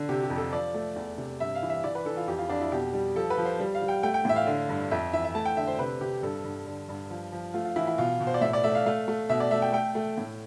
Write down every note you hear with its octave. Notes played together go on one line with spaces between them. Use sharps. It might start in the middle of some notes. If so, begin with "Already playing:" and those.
Already playing: D3
C3 G4
G4
F2
A4
F3 D5
A3
E2
C3
G2 E5
F5
E3
E5
E3 D5
B4
E3 A4
F4
F2 G4
F4
F2 D4
E4
B2 G4
G3
F3 A4
B4
F3
C5
G3
F5
G3
G5
A3 G5
G5
A2 E5
F5
D3
G2
F2 E5
E3 E5
E5
A3 A5
G5
D3 E5
C5
C3 B4
C3 G4
G2 A4
G2
D3
G2
F3
F3
A3 F4
F4
E3 E4
E4
B2 F4
B2
C5
D5
A2 E5
D5
A3 E5
F5
A3 F5
A3
B2 E5
D5
A3 E5
G5
A3 G5
A3
A2